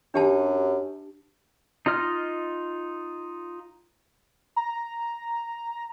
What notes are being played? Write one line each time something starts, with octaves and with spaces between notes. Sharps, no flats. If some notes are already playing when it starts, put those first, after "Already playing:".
F#2 D4 G4 A5
D#4 F4 D#5 F6
A#5